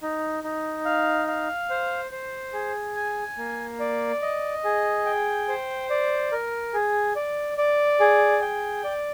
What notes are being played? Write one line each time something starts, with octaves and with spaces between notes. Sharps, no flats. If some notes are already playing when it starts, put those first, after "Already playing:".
D#4
D#4
F5
F5
C5
C5
G#4
G#5
A#3
D5
D#5
G#4
G5
C5
D5
A#4
G#4
D5
D5
G#4
G5
D5